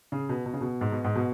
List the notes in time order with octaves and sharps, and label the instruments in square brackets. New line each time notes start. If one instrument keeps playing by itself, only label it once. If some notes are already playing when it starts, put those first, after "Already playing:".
[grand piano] C#3
B2
B2
C#3
B2
G#2
B2
G#2
B2